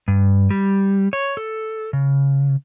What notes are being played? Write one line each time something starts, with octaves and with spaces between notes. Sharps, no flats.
G2
G3
C#5
A4
C#3